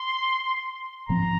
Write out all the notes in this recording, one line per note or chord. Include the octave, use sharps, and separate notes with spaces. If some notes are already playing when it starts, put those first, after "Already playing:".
Already playing: C6
G#2 F3 C4 A#5